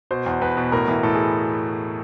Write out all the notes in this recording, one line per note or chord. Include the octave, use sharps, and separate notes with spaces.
B2 C5
E2
E2 B4
B2
A2 A#4
E3
A2 A4
G#4